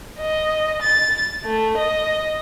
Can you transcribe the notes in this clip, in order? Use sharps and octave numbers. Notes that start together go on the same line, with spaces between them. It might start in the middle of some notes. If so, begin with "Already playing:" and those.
D#5
A6
A3
D#5